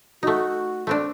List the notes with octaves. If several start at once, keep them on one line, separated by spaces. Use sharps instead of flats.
A3 D#4 F#4
A3 C4 D4